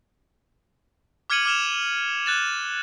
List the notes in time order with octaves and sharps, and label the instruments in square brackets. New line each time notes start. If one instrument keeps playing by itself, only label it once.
[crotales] D6 F6 G#6 C#7 D#7 F#7
D6 F6 E7 F7
F#6 A6 E7